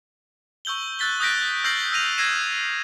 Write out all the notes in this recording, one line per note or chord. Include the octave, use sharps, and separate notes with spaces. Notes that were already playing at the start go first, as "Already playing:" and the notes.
C#6 E6 G6 F#7 G7
E6 F#6 A6 B6 G7
D#6 F#6 G6 A#6 B6 D7
E6 F6 G6 A#6 C7 F#7
E6 A#6 D#7 F7
E6 G#6 A#6 C7 D#7 E7